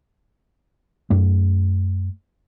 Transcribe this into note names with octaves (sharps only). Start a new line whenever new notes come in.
F#2 A3